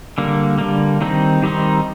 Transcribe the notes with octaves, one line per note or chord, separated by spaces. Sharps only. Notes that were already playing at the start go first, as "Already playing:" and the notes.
D3 G3 A#3
D3 G3 A#3
D#3 G3 C4 D#4
D#3 G3 C4 D#4